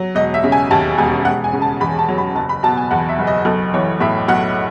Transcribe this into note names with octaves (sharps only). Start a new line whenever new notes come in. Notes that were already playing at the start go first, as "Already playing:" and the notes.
Already playing: F#3
E1 D#5
E5
C#3
G#5
D#2 A5
E1 G#5
E1 F#5
G#5
C#3
A5
E2 B5
A5
F#3
B5
F#1 A5
B5
B2 A5
G#5
E2 F#5
E5
F#1
D#5
B1 A4
E3 C#5
A2 E5
B1 F#5